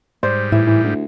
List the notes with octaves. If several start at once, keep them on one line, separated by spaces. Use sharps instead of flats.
G#2 G3 C5 D5
A2 E3 E4
E3
D2